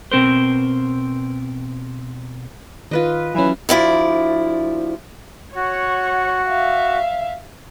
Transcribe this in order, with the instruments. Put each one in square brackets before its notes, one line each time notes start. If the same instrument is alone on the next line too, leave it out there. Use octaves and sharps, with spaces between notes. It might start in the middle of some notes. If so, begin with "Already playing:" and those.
[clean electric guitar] B2 C4 A#4 C5
[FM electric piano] D#3 [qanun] F4 B4 D#5
[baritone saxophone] E3 [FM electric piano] F#3 C#4
[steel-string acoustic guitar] D2 F3 E4 D5
[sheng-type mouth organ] F#4 [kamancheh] C#5 F#5
[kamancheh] E5 F5